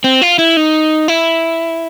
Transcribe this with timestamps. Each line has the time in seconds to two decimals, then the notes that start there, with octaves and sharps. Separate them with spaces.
0.04 C4
0.22 F4
0.39 E4
0.57 D#4
1.08 E4